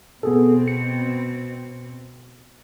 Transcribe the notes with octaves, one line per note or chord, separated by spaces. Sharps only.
B2 B3 C4 G#4 A4
C#7